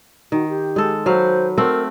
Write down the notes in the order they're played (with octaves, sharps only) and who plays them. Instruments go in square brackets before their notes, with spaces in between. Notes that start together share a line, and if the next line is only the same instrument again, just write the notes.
[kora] D#3 [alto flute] F#4
[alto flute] G4
[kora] G#3 A4
[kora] F#3 B4 F5 [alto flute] C5
[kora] A3 C4 F#5 [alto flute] A#4